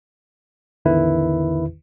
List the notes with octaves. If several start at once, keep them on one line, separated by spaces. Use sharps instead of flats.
A1 E2 D3 D#3 E4 B4